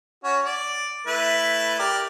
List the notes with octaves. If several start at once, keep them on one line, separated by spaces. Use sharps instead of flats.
C#4 F#4 C#5
D5
A3 E4 B4
G4 A#4 D5